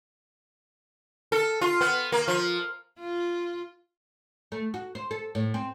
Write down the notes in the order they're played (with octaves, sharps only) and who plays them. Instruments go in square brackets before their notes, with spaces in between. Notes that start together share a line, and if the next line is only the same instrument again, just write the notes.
[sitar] A4
F4
B3
A#3
F3
[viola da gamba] F4
[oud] A3
F#4
C5
A4
A2
C4